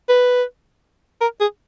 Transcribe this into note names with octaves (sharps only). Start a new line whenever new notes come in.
B4
A#4
G#4